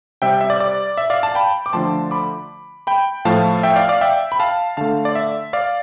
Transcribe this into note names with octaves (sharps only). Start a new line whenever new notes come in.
C3 G3 E5 G5
E5
D5
D5
E5
D5 F5
F5 A5
G5 B5
D6
D3 F3 A3 A5 C6
B5 D6
G5 B5
A2 F3 A3 F5 A5
E5 G5
D5 F5
D5 F5
E5 G5
B5
F5 A5
D3 A3 F5 A5
D5
E5
D5 F5